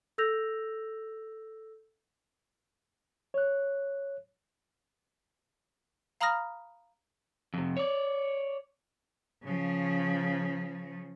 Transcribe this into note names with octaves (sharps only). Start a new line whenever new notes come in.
A4 E6 G6 A#6 F7
C#5 F#6
F5 A#5 B5 D#6 F6 A#6
F2 C3
C#5 D5
C#3 F3